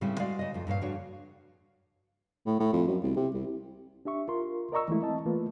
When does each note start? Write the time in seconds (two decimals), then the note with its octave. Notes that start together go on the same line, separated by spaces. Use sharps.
0.01 A2 C#3 G3 G#3 C4 E4
0.19 G#3 F#4 D5 F5
0.39 C#3 D#5
0.54 F2 F4
0.67 G2 A#2 C#5 F5
0.81 F2 C#3 D4 F#4 C#5
2.46 A2
2.59 A2
2.73 F2
2.87 F#2
3.04 C2
3.16 C3
3.34 C2
4.05 D4 G4 E5 C#6
4.28 F4 A#4 C6
4.72 A#4 D5 D#5 A#5 C#6 E6
4.88 E3 G#3 A3 E4
5.02 C4 D#5 A5
5.25 E3 A3 A#3 F4 B4